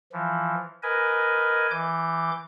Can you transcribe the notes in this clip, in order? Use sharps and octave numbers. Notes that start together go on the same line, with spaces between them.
E3 F3
A#4 B4 D#5 G#5
E3 D6 G6